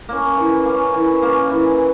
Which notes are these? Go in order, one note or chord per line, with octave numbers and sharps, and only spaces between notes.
A#3 C#4
E3
A#3 C#4
E3
A#3 C#4
E3